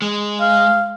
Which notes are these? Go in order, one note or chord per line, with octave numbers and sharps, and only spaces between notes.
G#3
F5